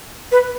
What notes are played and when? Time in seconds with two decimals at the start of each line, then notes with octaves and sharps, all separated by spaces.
0.32 B4